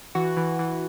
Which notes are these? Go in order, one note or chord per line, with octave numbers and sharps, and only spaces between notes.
E3 F#4
E3
E3